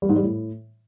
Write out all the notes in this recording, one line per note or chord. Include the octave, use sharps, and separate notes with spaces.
G3
G#2
G3
A2